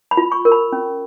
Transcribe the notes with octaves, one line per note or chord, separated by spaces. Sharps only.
B5
F4
C#6
A#4
B5
C#4